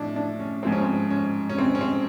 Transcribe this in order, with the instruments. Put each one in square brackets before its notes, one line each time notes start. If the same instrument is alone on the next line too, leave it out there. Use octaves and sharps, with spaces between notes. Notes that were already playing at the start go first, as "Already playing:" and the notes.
Already playing: [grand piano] A2 F3 [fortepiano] D4
[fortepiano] D4
C#4
[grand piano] G#2 F3 G#3 [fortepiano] C4
[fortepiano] C#4
C4
C#4
C#4
C4
C#4
C4